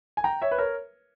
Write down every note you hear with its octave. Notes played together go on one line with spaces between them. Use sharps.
G#5
G5 A#5
C#5 E5
B4
A#4 C#5